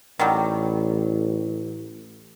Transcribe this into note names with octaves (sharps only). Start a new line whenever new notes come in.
A1 D#3 F#3 G3